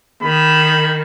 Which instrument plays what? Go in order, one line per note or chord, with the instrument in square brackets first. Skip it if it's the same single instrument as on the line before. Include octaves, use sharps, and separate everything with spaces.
[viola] D#3 [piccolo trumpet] B5